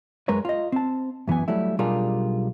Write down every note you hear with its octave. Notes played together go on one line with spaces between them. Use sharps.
F#2 G#3 A#4 B4 C#5
F4 D#5
C4 A5
F#2 E3 B3 G#5
F#3 G3 A3 E4
B1 G3 D4 F4 G#4 A#4